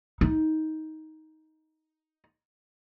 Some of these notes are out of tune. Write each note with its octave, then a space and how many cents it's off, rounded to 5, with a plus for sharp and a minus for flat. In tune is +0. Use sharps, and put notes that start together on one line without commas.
D#4 +15